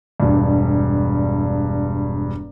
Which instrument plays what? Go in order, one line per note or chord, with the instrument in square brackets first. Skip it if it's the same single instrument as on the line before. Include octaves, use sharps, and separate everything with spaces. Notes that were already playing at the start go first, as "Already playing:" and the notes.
[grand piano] E1 G2